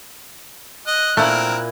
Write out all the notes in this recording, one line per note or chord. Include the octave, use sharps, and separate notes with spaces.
D#5 F#6
A#2 A3 C4 E4 A#4